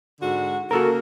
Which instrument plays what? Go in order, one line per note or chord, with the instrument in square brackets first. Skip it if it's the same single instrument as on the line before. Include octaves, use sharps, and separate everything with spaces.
[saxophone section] G#2 D3 F#4
[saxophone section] C#3 A#3 [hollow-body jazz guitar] F#4 A4 A#4